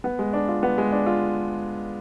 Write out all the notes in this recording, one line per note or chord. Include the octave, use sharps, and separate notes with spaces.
B3
G#3
D4
F4
B3
G#3
D4
F4